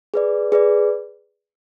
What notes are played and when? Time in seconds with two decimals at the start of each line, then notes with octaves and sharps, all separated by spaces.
0.14 G#4 B4 D5
0.52 G#4 B4 D5